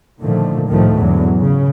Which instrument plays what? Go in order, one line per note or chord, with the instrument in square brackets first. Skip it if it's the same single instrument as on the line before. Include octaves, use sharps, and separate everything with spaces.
[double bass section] A#2 D3 D#3 F3 A3
C2 A2 D#3 F3 A3
E2 G#2 D3 F#3
C#3